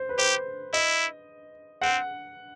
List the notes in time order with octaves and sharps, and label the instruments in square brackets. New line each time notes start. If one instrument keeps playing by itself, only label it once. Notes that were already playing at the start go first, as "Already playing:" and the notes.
Already playing: [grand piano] C5
B4
[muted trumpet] G4 [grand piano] C5
[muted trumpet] E4 [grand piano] D#5
[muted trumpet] C4 [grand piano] F#5